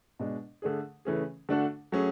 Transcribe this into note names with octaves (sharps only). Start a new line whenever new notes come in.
B2 G#3 D4
D3 A3 D4 G#4
C#3 E3 A3 C#4 G#4
D3 A3 D4 F#4 A4
F#3 A3 C#4 G#4